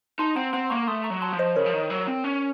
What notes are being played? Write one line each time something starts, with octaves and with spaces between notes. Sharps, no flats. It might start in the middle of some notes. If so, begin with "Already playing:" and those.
D#4 A5 C6
C4 F#5 A#5
C4 F#5 A#5
A#3 A#5 C#6
A3 C6 D#6
A#5 C#6
F#3
A5 C6
F3
C5 D#5
C#3 A#4 C#5
F3
D#3
F#3
C4
C#4